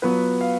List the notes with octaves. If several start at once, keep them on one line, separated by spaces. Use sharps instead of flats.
F#3 B3 F4 B4
F5